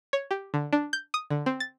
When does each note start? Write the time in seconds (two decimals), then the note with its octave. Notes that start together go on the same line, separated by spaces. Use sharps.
0.13 C#5
0.31 G4
0.54 D3
0.73 D4
0.93 G6
1.14 D#6
1.31 D3
1.46 C4
1.60 A6